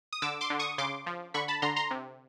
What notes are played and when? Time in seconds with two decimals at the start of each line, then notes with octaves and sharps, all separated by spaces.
0.13 D#6
0.22 D3 D6 E6
0.41 C6 D6
0.50 D3
0.59 C#6 D#6
0.78 C#3 C6 D6
1.06 F3
1.34 D3 B5 C#6
1.48 A5 B5
1.62 D3 A#5 C6
1.76 A#5 C6
1.91 C3